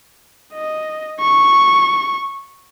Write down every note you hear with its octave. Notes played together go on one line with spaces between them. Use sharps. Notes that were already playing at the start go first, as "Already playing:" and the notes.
D#5
C#6